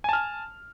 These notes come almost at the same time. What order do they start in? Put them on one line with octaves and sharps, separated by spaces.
G#5 A5 F6